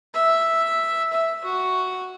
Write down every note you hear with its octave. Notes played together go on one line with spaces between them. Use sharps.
E5
E5
F#4